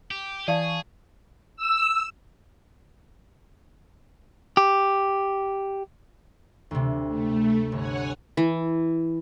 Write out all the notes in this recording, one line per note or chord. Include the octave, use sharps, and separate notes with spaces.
G4
E3 G#4 D5 F5 A5 C#6
E6
G4
D2 C3
A3
G1 C#5 F#5 G#5
E3